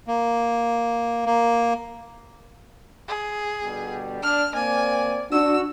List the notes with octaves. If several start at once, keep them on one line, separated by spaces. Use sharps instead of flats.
A#3
A#3
G#4
B2 D3 G3
D4 F6
A#3 C4 D5 G#5
D4 F#4 E6